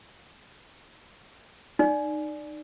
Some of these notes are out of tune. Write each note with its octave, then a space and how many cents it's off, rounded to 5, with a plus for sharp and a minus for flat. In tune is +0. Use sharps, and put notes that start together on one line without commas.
D#4 -30 D5 +0